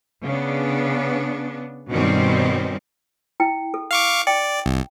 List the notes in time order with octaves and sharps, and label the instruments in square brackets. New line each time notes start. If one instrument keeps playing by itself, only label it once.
[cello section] C#3 B3 D4
G2 B2 D#3 G3 C4 C#4
[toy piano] E4 G5
A4
[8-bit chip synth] F5 C#6 D6
[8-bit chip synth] D5 [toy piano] G5
[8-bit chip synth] C2